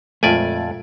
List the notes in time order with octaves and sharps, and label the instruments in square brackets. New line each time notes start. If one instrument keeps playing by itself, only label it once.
[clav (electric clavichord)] F2 D5 G#5 [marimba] A#2 G#3 F4 [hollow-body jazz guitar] A3